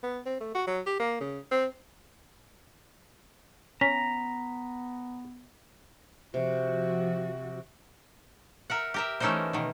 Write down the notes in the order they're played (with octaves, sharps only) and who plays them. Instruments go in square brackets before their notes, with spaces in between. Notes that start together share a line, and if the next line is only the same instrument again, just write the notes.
[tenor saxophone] B3
C4
A3
F#4
F#3
G4
A#3
C#3
C4
[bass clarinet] B3 [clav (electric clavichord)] C#4 [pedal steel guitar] A#5 [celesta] B6
[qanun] C3 [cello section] F3 F#4
[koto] A#4 E5 F#5
G4 A#4 E5
E3 A3 C#4 D#4 A#4 C5
B2 D#3